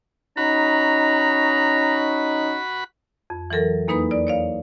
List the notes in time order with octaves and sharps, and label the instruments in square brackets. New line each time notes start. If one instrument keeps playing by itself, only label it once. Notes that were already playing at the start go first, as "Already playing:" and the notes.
[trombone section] C#4 D#4 [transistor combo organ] F#4 B5 [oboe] A#5
[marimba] F2
E3 F#3 A4 A#4
E2 A#3 D#4 B4 B5 D#6
D5
C#5 D5 F5